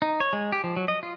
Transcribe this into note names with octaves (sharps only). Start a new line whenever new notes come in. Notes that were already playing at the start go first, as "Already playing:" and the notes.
D#4
C#5
G#3
G4
F3
F#3
D#5
F4